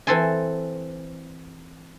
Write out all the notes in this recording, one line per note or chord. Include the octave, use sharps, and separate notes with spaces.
E3 C4 A4 C5 G#5